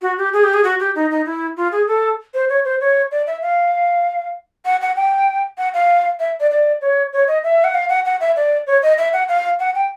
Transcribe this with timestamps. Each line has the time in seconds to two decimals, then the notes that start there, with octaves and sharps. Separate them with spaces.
0.02 F#4
0.18 G4
0.33 G#4
0.44 G4
0.54 G#4
0.64 F#4
0.80 G4
0.95 D#4
1.11 D#4
1.25 E4
1.57 F4
1.72 G#4
1.87 A4
2.34 C5
2.49 C#5
2.65 C5
2.81 C#5
3.11 D5
3.27 E5
3.42 F5
4.65 F#5
4.81 F#5
4.96 G5
5.58 F#5
5.74 F5
6.20 E5
6.40 D5
6.51 D5
6.82 C#5
7.13 C#5
7.28 D#5
7.44 E5
7.64 F#5
7.74 F5
7.89 F#5
8.05 F#5
8.20 E5
8.36 D5
8.67 C#5
8.83 D#5
8.98 E5
9.13 F#5
9.29 F5
9.60 F#5
9.75 G5